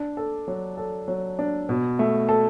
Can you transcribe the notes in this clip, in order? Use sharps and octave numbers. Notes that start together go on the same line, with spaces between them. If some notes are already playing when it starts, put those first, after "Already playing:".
Already playing: D4
A4
F#3
A4
F#3
D4
B2
A3
A4